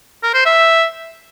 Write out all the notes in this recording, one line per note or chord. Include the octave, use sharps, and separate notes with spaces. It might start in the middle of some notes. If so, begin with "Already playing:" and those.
A#4
C5
E5